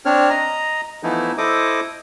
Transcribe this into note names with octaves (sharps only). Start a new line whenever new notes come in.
C4 D4 C#5 F6
D#5 A#5
E3 F3 A3 B3 D#4 E4
E4 A4 C5 D#5 D6 D#6